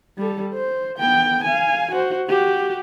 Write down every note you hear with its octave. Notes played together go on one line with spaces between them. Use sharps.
G3 A4
C5
B3 G5
F5 G#5
F#4 C5
F#4 G4